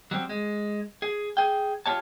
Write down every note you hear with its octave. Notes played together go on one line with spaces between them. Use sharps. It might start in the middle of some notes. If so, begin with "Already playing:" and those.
F#3 G3 C4
G#3
G#4
G#4 G5
F4 G4 C#5 A5